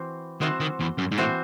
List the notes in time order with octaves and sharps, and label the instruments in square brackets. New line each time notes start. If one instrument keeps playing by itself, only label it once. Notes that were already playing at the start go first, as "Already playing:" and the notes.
Already playing: [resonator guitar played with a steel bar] E3 C4 F#4 C5
[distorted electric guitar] D#3 [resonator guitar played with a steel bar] E3 C4 F#4 C5
[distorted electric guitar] D#3
E2
F#2
G#2
[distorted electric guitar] A2 [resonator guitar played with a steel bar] E3 C4 F#4 C5